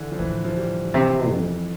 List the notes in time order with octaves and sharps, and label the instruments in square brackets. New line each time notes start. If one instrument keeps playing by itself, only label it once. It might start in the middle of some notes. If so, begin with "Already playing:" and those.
Already playing: [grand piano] D3 E3
F3
[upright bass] A2 [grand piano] E3
[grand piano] F3
G3
[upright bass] C3 [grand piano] E3
[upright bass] F2